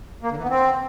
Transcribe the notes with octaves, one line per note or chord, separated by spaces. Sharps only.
A#3
D3
E3
B3
C4